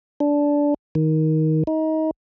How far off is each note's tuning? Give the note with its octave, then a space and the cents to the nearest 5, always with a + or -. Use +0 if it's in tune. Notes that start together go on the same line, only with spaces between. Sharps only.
D4 -15
D#3 +15
D#4 +25